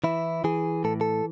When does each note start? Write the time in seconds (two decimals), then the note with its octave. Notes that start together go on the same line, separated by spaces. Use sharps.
0.04 E3 E4
0.44 E3 G#4
0.84 A2 A4
1.01 A4